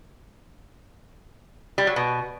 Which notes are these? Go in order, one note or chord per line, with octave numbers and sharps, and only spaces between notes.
G3
F#3
B2